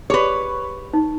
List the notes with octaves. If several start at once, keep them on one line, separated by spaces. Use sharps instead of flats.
G4 G#4 B4 C#5 C6
D#4